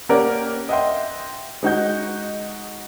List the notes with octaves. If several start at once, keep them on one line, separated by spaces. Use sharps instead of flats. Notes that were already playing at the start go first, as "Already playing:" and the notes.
A#3 C#4 G4 A#4 D5 F#5
D#5 E5 F#5 G5 C6
G#3 D#4 F#4 G6